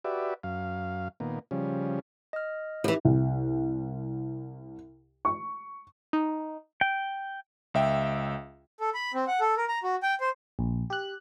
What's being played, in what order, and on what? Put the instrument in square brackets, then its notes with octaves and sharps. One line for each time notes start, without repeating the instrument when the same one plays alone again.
[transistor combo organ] F#4 G4 B4 D5 E5
F#2 F5
A#2 D#3 A#3 B3
C#3 F3 G3 C#4
[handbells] D#5 F6
[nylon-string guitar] E3 F3 [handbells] E4 G4
[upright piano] C2
C#6
[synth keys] D#4
[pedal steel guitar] G5
[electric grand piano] C#2 E5 G5
[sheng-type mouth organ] A4
B5
C4
F#5
A4
A#4
A#5
F#4
G5
C5
[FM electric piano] A#1
G4 F#6